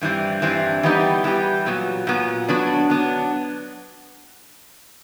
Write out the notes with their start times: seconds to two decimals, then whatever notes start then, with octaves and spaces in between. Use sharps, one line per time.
0.01 G2 E3 G3 C4
0.42 G2 E3 G3 C4
0.83 E3 G3 B3 D#4 G4
1.24 E3 G3 B3 D#4 G4
1.66 A#2 F#3 B3
2.07 A#2 F#3 B3
2.49 F#3 B3 D4
2.90 F#3 B3 D4